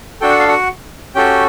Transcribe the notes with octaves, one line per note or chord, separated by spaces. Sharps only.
D4 F#4 A4 G5
F#5
F5
F#4 F#5
C#4 F#4 G4 A4 G5